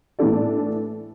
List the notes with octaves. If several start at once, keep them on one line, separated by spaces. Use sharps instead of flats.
A2 E3 D4 A4 D5